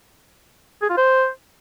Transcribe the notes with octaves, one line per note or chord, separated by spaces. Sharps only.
G#4
F4
C5